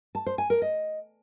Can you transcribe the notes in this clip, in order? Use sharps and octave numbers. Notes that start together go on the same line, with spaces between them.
A5
C5
G#5
A#4
D#5